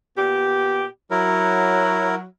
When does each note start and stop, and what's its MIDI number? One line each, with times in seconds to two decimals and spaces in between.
0.16 0.85 46
0.16 0.85 59
0.16 0.85 67
1.11 2.23 54
1.11 2.15 64
1.11 2.15 70